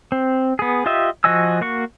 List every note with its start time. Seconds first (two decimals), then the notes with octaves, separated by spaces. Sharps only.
0.12 C4
0.59 B3 G#4
0.86 F4 G4 D#5 E5
1.24 F3 F#4 D#5 G#5 E6
1.61 A#3 F#4 C#6